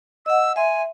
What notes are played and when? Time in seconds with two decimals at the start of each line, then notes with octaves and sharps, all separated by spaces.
0.26 D#5 F#5 E6
0.56 E5 G#5 C6